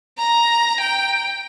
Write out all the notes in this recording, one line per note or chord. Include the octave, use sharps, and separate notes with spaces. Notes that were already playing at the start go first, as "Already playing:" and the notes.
A#5
G5